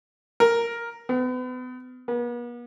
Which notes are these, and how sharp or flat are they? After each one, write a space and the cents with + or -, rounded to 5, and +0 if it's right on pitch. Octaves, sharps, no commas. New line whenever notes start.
A#4 +0
B3 +35
B3 -45